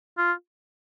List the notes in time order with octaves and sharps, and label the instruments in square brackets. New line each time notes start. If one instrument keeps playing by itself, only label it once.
[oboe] F4